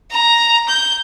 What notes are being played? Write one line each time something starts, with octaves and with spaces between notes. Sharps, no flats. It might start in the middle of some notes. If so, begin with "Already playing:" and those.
A#5
G6